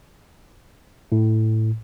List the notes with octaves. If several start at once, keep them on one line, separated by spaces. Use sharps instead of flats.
A2